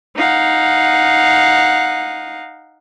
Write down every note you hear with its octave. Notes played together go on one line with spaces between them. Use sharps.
D#4 F5 F#5